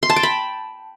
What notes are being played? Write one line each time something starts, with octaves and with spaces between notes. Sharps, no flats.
C6
A5
G5
B5